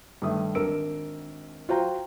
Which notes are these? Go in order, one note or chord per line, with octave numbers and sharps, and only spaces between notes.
G2 D#3 A3 E5 D#6
G#1 D4 A#4 E6 D7
F4 F#4 C5 G5 A#5